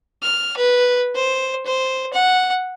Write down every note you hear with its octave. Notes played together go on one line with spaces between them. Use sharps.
F6
B4
C5
C5
F#5